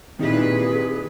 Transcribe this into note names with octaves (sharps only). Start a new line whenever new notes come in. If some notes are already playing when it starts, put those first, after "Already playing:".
A#2 D#3 C4 D#4 E4 G4 G#4 B4